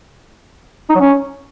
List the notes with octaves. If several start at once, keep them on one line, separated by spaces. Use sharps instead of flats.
D#4
F#3
C#4